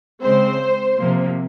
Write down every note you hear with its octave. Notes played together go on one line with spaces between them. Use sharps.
C#3 G#3 C4 C5
C3 F3 A#3